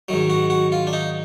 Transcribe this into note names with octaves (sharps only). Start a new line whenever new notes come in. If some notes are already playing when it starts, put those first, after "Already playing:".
G#2 D#3 F#3
F#4
F#4
F4
D4
D#4